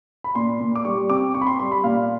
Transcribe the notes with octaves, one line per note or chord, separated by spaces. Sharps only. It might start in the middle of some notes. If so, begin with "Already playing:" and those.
B5
A#2 C6
A#2
D6
G3 C#6
C4 D6
C4 C#6
B5
C6
G3 C6
B5
A#2 F5